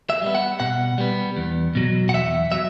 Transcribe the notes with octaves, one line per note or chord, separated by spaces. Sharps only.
E5
G3 B3
F#5
B2 F#5
G3 B3
E2
B2 F#3
F#5
E2 E5
F#3 E5